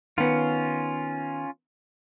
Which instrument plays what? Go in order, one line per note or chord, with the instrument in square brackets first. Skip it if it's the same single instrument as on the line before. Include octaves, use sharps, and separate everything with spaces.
[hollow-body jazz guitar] D#3 B3 [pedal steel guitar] C#4 F4